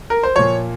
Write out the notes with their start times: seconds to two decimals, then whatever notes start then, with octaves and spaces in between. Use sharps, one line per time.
0.10 A#4
0.23 C5
0.36 A#2 F3 C#5